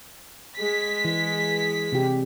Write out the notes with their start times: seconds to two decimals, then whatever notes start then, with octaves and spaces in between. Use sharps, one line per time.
0.58 G#3 B6
1.05 E3
1.92 C3 G4